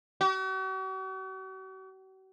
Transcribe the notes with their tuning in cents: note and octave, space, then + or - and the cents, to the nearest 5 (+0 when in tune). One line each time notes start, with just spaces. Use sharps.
F#4 +45